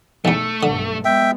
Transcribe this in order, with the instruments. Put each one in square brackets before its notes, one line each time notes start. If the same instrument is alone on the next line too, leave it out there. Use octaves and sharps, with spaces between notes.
[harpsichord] B1 E2 [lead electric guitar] A3
[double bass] B1 G2 [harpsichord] D3
[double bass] G#3 B3 [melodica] E5 G5